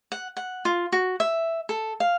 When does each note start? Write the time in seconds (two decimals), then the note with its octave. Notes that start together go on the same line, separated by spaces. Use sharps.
0.12 F#5
0.37 F#5
0.65 F4
0.92 F#4
1.20 E5
1.69 A4
2.00 F5